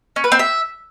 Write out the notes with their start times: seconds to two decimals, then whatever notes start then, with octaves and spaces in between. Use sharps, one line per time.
0.16 C#4
0.24 B4
0.32 C4
0.39 E5